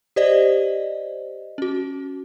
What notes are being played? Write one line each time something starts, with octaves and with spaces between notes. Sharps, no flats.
G4 C5 D5 D#5
C#4 F#4